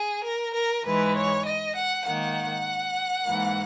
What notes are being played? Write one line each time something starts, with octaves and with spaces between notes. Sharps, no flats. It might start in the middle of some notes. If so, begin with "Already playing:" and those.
Already playing: G#4
A#4
A#4
G#2 E3 G#3 B4
C#5
D#5
F#5
G#2 D#3 A#3 F#5
G#2 E3 A#3